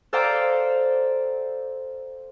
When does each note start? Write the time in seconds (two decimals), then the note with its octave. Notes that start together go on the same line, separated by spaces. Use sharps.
0.13 A4 C5 D5 F5 G5 A#5